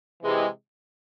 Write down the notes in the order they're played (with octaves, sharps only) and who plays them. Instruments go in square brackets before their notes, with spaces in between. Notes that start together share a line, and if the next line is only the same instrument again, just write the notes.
[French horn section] C3 E3 G#3